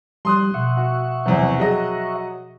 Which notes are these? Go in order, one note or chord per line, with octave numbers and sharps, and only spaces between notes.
F3 G3 C6 D#6 F#6
B2 E5 F#5 C#6
F#4
E2 C3 F3 F#3
F#3 G#4 D#5 G5 A5